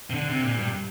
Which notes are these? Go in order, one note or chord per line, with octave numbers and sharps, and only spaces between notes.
C3
D3
C3
A#2
G2